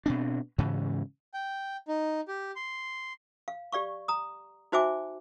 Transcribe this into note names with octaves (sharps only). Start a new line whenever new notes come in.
B2 C4 D4
G#2 C#3 E3
G5
D#4
G4
C6
F5
G4 D5 F5 C#6
A#5 D#6
D#4 F#4 C5 E5 G#5 D6